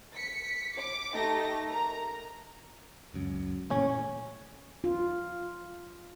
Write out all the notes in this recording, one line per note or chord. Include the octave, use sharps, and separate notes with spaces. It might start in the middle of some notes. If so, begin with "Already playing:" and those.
B6 C#7
D6
A3 D#4 G4 A#6
A#4 A#5
C#2 F#2
A#2 E3 A3 C#4
F4